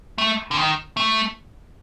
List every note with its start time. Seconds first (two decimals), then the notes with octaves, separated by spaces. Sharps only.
0.18 A3
0.51 D3
0.57 D#3
0.97 A3